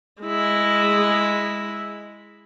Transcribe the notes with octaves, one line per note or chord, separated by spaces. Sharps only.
G#3 E4